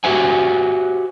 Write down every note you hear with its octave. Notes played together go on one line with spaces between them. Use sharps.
F#4 G4 C5 E5 F#5 G#5